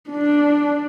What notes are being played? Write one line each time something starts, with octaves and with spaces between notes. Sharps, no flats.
D4